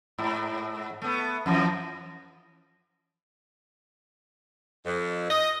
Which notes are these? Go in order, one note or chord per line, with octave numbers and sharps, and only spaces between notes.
G#2
A3 B3
F2 E3 F3
F2
D#5